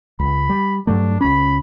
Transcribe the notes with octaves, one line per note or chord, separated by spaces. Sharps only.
C#2 B5
G3
G2 F#3 A3 D4
C#2 C#4 B5